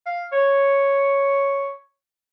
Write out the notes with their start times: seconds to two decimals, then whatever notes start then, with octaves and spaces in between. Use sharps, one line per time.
0.06 F5
0.32 C#5